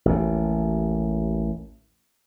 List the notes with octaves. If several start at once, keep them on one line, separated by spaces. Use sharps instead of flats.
A1 D#2